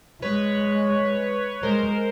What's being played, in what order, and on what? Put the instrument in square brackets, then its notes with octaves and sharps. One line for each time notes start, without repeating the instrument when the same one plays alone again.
[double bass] G#3 [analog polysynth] B4 C#5
[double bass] G#3 [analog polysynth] A#4 C5